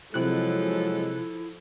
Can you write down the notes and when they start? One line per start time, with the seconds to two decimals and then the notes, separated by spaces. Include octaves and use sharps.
0.14 C3 F3 F#3 G#3 E4 A4 F#6